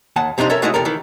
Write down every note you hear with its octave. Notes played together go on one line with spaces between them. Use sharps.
D#2 F#5 A5
F2 C3 G3 D4 D#4 C5
C#4 A4 A#4 C#5 E5
G#3 A3 D#4 E4 F#4 D#5
E2 C3 A4 A#4
D#3 E3